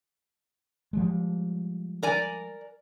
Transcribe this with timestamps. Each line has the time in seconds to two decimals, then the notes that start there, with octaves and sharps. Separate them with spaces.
0.93 F3 G3 G#3
2.03 A#4 D5 G#5